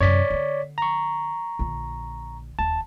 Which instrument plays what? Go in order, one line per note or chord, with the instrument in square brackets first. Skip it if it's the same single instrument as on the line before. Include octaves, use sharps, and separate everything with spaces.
[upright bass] F#2 C3 [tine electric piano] C#5 D5 B6
[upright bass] D3 B3
[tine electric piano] A#5 C#6
[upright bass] A#1 D3
[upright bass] E1 D#2 [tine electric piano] A5